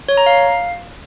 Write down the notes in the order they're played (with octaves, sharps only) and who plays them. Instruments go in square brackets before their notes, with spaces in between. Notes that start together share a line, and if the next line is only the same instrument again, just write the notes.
[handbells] C#5
A#5
F5